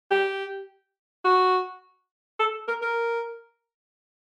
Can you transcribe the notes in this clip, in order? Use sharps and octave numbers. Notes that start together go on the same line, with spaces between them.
G4
F#4
A4
A#4
A#4